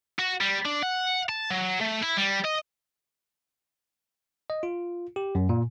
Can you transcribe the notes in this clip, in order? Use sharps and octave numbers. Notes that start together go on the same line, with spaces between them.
F#4
G3
D4
F#5
A5
F#3
A3
E4
G3
D#5
D#5
F4
G4
F#2
A#2